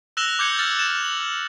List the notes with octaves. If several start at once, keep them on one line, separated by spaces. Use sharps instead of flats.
E6 F#6 A#6 E7 F7 G7
D6 G6 G#6 C#7
F6 G6 A6 F#7
E7
F#7